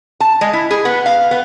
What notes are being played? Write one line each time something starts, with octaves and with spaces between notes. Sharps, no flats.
A5
G#3
E4
G#4
B3
F5
B3